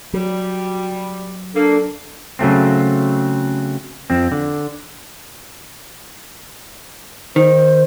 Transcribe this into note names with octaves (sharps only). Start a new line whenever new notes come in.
F#3 G3
A#3 D4 A4
C#3 F#3 A3 C4
F2 C4
D3
D#3 C5